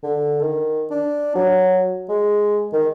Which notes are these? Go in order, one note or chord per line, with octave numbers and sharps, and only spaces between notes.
D3
D#3
D4
F#3
G#3
D#3